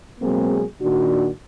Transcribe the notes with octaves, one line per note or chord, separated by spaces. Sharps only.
B2 F#3 G#3 A#3 C4 G#4
A#2 D#3 D4 F#4